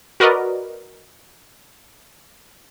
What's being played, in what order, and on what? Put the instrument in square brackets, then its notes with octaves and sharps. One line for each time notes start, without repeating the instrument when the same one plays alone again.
[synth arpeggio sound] F#4 A#4 B4 D5 D#5